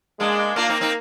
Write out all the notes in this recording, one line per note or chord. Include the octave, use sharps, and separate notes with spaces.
G#3 A#3 D4
A#3 D4 F4
C4 D#4
C4 D#4